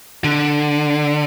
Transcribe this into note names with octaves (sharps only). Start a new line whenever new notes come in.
D3